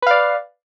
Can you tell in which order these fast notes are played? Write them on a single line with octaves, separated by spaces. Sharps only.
B4 F5 D5